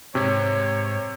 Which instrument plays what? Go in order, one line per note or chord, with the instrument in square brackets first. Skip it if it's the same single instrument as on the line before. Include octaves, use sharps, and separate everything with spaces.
[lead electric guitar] B1 G#2 [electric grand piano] C3 [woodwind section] C#5